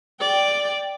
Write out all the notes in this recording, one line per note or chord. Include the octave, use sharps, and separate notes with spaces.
D5 G5